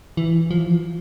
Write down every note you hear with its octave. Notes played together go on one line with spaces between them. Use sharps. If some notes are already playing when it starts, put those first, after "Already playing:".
E3
F3
E3
F3